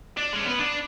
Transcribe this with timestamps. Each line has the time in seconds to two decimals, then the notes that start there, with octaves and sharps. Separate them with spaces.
0.17 D4
0.33 G#3 C#4
0.46 B3 B4
0.59 D4